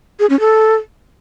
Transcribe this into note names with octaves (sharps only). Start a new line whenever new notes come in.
G#4
C#4
A4